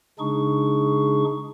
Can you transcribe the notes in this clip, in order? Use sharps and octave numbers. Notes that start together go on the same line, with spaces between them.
C#3 G#3 D4 D#4 G#4 C#6